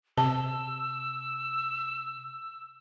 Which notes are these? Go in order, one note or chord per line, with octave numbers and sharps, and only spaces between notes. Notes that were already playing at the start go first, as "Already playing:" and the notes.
C3 A5 E6